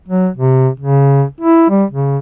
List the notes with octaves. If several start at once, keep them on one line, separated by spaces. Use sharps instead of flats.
F#3
C3
C#3
E4
G3
C#3